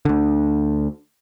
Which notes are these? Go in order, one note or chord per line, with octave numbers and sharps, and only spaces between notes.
D2 D3